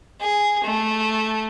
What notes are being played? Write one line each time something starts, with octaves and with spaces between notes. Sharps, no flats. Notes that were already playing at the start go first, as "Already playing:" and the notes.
G#4
A3